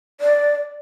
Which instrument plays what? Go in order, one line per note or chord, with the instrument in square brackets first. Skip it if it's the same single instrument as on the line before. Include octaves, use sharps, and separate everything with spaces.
[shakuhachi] D5